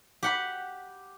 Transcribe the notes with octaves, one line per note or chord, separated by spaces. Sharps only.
G4 F#5 B5